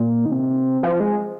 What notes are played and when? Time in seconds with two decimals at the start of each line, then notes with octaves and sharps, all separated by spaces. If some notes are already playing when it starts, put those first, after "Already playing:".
Already playing: A#2
0.26 D#3
0.32 C3
0.83 F3
1.00 G#3